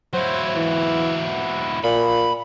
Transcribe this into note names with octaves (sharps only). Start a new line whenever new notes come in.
F#3 E4 C5
E3
A#2 B5